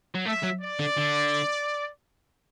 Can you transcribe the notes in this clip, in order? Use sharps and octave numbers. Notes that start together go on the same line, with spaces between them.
F#3
A3 E5
F#3
D5
D3
D3